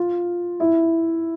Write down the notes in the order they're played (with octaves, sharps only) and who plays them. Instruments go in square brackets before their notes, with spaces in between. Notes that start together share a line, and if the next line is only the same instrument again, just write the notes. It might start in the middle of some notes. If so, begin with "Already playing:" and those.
Already playing: [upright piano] F4
E4